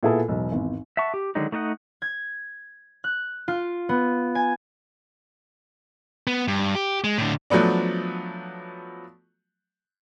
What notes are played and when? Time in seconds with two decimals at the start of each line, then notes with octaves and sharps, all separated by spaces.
0.03 A#2 B3 E4 G#4 A4
0.29 E1 B1
0.52 G#1 E2
0.97 E5 F#5 A5 C#6
1.14 G4
1.35 D3 D#3 F#3 G#3 D#4
1.52 A3 D#4 D#5 E5 F#5
2.02 G#6
3.04 F#6
3.48 F4
3.89 B3
4.35 G#5
6.27 B3
6.48 G2
6.75 G4
7.04 G#3
7.18 A2 D3
7.50 F3 F#3 A3 B3 D4